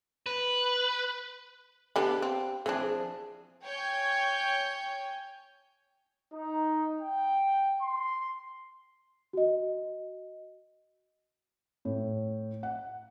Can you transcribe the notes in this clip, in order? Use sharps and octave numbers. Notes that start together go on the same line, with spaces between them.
B4
D3 B3 D4 G4 F5
C4
E3 F3 C4 D4 G#4
C#5 G5 G#5 G6
D#4
G5
C6
F#4 D#5
A2
F#5